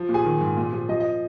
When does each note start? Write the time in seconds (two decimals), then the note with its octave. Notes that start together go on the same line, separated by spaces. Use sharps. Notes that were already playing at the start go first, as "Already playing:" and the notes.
Already playing: F3
0.09 A#2
0.14 G#4 G#5
0.25 D#3
0.41 G#2
0.57 A#2
0.73 F3
0.89 F3 D#5
1.00 D#5